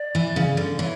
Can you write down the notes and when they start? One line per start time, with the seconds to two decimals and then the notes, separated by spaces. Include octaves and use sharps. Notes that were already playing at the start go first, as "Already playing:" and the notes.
Already playing: D5
0.15 E3
0.36 C#3
0.57 D3
0.78 E3 C#5